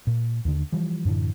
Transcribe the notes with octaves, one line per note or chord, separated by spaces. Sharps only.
A#2
D#2 D3
E3 F3 G3
F#2 A2 D3 E3